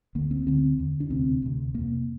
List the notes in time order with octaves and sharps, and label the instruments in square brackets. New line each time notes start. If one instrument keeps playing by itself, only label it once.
[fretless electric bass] D2 D3 A#3
C4
D2 D3 C4
E2 D3
D4
D2 C3 C4
D2 C3
F2 C3 A#3